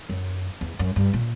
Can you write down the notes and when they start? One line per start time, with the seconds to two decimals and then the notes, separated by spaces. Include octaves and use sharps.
0.09 F#2
0.61 E2
0.79 F#2
0.96 G2
1.14 A#2